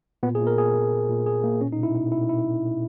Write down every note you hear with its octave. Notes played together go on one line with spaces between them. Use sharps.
A#2 B3
G#4
A#2
A#4
A#2 G#4
A#2
A#2
A#2
A#2 G#4
A#2 A#3
B2 C#4
D#4
B2 E4
B2 E4
B2 E4
B2 E4
B2
B2